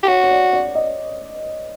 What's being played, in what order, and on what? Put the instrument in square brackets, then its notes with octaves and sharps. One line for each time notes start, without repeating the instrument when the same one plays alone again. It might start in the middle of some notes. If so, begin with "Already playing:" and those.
[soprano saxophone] G4
[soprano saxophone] F#4 [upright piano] C#5
[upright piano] C#5
D5
D5
D#5